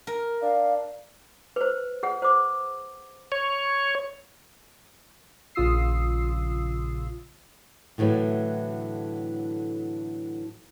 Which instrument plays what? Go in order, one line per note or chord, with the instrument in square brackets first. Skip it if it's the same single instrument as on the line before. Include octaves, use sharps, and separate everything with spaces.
[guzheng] A#4
[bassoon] D4 [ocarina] F5
[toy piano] B4 C5
G#4 F#5
C5 D6
[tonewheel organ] C#5
[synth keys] A#1 C#3 F4 D#6 E6 C7
[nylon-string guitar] A2 D3 E3 F#3 A3